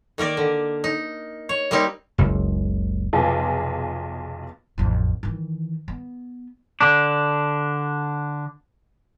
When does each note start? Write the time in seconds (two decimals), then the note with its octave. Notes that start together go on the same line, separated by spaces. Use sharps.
0.18 D#3 A#3 A#4 D5
0.37 D3
0.84 D#4
1.49 C#5
1.71 G3 A#3 C4 D#4 G4
2.18 F#1 C#2
3.13 F1 B1 F4 G#4 A5
4.78 A1 F2
5.23 D#3 E3
5.88 B3
6.81 D3 D4